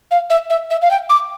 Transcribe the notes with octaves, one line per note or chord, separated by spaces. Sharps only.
F5
E5
E5
E5
F5
G5
D6